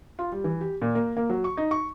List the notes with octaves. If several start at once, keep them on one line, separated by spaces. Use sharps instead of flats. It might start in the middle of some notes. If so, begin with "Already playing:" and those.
F4
G3
E3
G4
A#2
A#3
A#3
F#3
C#6
D#4
C#6